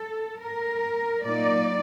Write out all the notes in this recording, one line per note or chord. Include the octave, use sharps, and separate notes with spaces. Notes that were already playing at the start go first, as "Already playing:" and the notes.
Already playing: A4
A#4
A#2 F#3 A#3 D#4 D5